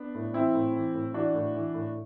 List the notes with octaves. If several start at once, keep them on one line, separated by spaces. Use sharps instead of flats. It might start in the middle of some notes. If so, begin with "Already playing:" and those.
Already playing: B3 D4
A2
E3 C4 E4
A2
E3
A2
E3 D4 F#4
A2
E3
A2